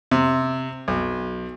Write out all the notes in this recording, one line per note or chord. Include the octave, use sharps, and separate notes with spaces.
C3
B1